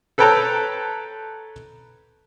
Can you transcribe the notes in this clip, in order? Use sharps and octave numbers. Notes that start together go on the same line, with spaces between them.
A4 B4 C#5 G5 A5 A#5